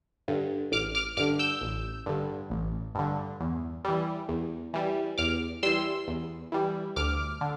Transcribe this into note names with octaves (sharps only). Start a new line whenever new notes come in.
G2 D3
A1 D6 F6
D6 F6
G2 D3 D6 F6
E6 G6
A1
G2 D3
A1
G2 D3
E2
E3 G3
E2
E3 G3
E2 D6 F6
E3 G3 C6 E6
E2
E3 G3
D2 D6 F6
D3